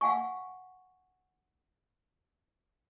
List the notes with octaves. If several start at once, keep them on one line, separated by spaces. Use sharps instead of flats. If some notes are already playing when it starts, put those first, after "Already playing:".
F5 F#5 G#5 C#6